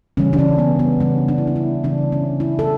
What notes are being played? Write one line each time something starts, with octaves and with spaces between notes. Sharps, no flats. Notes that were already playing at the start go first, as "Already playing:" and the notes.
C#3 E3 G3 C#4
D4
C#4
B3
B3
C#3 E3 G3 C#4
D4
E4
D4
E4
C#3 E3 G3 D4
C#4
E4
A4